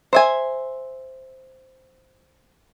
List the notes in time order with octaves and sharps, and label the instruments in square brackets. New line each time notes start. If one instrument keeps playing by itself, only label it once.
[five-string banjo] C5 E5 G#5